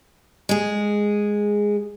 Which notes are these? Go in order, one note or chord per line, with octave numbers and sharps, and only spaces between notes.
G#3 G#4